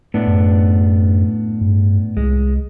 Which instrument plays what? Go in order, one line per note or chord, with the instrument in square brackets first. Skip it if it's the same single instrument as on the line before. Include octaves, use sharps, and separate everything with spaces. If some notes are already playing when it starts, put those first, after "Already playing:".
[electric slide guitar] A2 B3 D4
[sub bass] F#2
G2
[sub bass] C2 [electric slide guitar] G#3